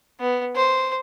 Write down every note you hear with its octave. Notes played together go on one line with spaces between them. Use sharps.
B3
C5